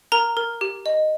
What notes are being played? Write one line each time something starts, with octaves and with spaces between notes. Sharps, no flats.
A#4 A#5
A#4
G4
D#5